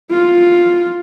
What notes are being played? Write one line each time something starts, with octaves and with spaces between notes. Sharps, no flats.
F4